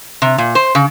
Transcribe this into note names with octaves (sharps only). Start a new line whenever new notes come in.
C3
A#2
C5
C#3